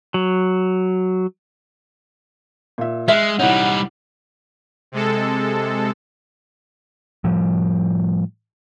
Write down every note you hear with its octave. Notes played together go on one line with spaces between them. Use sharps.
F#3
A#2 E5
G#3 E5 F6 F#6
C2 G3 D#4 E4 C#5 F#5
C3 G#3 A4
A2 F3 G3